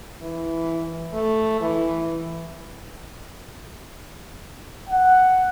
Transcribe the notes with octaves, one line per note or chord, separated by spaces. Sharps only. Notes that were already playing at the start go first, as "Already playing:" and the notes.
E3
A3
E3
F#5